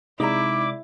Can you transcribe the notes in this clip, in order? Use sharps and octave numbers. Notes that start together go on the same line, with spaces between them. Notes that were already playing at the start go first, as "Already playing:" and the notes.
C3 G#3 D#4 E4 D5 A#5 D6